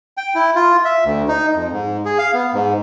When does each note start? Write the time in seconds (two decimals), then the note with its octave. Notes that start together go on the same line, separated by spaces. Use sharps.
0.17 G5
0.35 E4
0.55 F4
0.85 E5
1.05 D2
1.28 D#4
1.55 F2
1.72 G#2
2.05 G#4
2.18 F5
2.34 B3
2.54 G#2